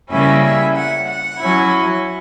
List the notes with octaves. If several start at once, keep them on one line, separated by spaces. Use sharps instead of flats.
C#3 G3 A#3 C#4 E4 E5
E5
F#5
F#5
F#3 C#4 E4